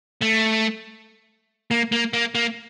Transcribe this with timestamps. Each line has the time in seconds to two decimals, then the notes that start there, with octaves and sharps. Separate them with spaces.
0.22 A3
1.71 A#3
1.92 A#3
2.13 A#3
2.35 A#3